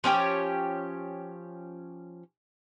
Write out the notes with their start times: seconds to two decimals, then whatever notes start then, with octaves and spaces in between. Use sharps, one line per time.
0.04 F3 C#4 G4 C#5